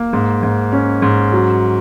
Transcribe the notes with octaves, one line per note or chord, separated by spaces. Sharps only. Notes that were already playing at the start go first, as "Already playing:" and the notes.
Already playing: A#3
G#2
G#2
C#4
G#2
F#3